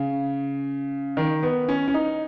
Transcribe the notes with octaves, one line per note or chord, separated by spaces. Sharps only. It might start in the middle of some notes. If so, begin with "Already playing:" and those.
Already playing: C#3
D#3
B3
C#4
C#4
D#4